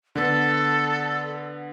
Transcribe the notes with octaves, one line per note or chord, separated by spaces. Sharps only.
D3 B3 A4